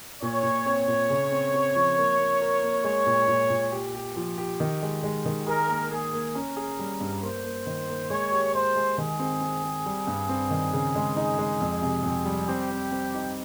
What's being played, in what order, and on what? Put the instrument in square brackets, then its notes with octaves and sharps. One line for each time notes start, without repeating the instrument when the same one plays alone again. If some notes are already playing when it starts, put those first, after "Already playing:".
[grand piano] A#2 [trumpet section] C#5
[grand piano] A#2
C4
A#2
C#3
C4
C4
F3
A#3
A#3
A#4
A#3
[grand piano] G#3 [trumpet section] C#5
[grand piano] A#2
A#2
A#2
G4
G4
F3
G4
D#3
G#3
G#3
D#3
[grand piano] G#4 [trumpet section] A#4
[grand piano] A#3
[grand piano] A#3 [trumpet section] G#4
[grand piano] A#3
[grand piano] C#4 [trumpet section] A#4
[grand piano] G#4
G3
G2
[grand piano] A#3 [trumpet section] C5
[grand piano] A#3
D#3
A#3
[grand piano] G#3 [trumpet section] C#5
[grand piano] G4
[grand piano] G#3 [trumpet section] C5
[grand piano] G#3
[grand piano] D#3 [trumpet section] G#4
[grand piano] C4
C4
C4
G3
G2
C4
D#3
C#3
G#3
D#4
G#3
F2
C3
F2
G3
[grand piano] C4 [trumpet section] G4
[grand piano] C4
C4
D#4